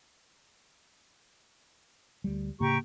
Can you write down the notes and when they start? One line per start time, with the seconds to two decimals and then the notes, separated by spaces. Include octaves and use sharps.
2.24 D2 G3
2.60 A2 C#3 A#3 G4 A#5 C#6